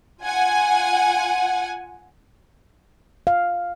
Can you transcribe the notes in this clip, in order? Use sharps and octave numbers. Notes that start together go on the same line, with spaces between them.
F4 F#5 G#5
F5